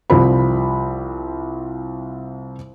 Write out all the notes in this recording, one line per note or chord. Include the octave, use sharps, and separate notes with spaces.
C2 F3 C4 B5